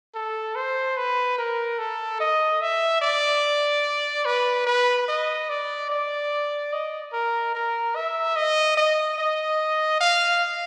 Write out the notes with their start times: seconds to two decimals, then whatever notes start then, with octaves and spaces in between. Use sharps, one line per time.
0.15 A4
0.56 C5
0.97 B4
1.38 A#4
1.79 A4
2.20 D#5
2.61 E5
3.02 D5
4.25 B4
4.67 B4
5.08 D#5
5.49 D5
5.90 D5
6.73 D#5
7.13 A#4
7.55 A#4
7.96 E5
8.36 D#5
8.77 D#5
9.18 D#5
10.00 F5